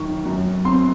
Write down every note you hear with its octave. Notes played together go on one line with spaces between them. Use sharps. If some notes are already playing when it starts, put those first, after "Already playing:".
Already playing: F#2 D#3 C#6
F#2
C4 C6